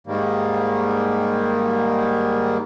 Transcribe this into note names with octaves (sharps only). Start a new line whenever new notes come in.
G#2 D#3 G3 A#3